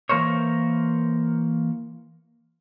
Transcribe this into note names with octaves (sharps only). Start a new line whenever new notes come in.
E3 A#3 A#4 C5 C#5